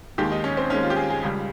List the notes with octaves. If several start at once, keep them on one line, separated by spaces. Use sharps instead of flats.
D#2 D#3 G#3 G4
D#4
C#4
C4
D#2 D#3 G#3 C#4
F4
G4
G#4
G#4
C#2 C#3 G3